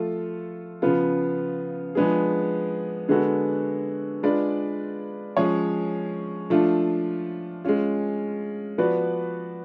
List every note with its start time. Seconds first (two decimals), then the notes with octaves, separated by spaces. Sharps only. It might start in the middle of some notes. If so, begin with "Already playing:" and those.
Already playing: F3 A3 F4 A4
0.82 C#3 F3 B3 F4
1.95 F3 G#3 B3 D4 G#4
3.09 D3 G#3 B3 F#4 A4
4.23 G#3 D4 F4 B4 D5
5.37 F3 G#3 C#4 G#4 C#5
6.50 F3 A3 D4 F4
7.64 G#3 C#4 F4
8.78 F3 B3 F#4 B4 D5